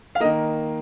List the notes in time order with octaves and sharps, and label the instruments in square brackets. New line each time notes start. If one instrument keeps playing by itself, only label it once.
[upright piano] F5
A#3 D#5
D#3